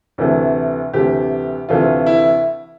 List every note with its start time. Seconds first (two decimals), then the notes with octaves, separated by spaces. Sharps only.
0.18 D2 C3 E3 A3
0.93 D2 C3 E3 A3 G4
1.69 D2 C3 E3 A3 F4
2.06 E4